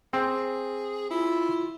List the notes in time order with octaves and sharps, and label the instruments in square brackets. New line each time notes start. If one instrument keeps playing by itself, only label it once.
[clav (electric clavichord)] C4 [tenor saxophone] G#4
[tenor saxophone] E4 [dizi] F4